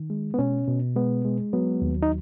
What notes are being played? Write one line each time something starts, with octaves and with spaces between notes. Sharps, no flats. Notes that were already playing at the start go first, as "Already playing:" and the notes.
Already playing: D#3
G#3
B3
B2 C#4
B2
G#3 B3
G#3
F#3 B3
D#2
D#4